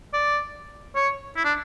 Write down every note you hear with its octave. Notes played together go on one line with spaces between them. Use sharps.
D5
C#5
E4
D4